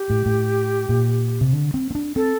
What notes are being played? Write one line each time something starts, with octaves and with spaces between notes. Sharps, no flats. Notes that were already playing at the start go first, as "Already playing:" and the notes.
Already playing: G4
A2
A2
A#2
C3
D3
C4
C4
D4
C4 A4